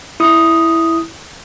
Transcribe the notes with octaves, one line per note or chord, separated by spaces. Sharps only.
E4 D#6